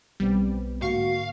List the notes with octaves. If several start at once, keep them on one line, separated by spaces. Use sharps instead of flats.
B1 G3 B3 C4
G#2 D3 A#3 F#4 F5 C#6